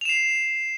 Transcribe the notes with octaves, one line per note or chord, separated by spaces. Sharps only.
C7 E7 F7